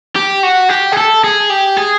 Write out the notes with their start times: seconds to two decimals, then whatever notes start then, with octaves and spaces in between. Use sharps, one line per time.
0.16 G4
0.43 F#4
0.70 G4
0.93 G#4
0.97 A4
1.24 G#4
1.50 G4
1.77 G#4